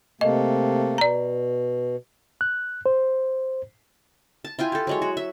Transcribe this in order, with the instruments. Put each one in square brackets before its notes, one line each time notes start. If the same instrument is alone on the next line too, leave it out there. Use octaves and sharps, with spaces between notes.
[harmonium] C3 A3 A#3 [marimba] D#5
[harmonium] B2 [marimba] D5 A#5
[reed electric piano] F#6
C5
[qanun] A5
E4 F4 G5 G#5
G4 A4
F#3 G#3 C#5
F#4
E5